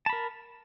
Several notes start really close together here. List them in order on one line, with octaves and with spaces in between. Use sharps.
A5 B5 A#4